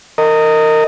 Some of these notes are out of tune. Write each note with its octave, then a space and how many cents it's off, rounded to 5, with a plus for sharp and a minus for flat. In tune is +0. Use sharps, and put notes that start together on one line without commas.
A#4 -25 D#5 +0